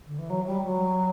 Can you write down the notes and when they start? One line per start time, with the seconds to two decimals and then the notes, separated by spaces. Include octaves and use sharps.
0.06 D3
0.18 E3
0.29 F#3
0.46 G3
0.63 F#3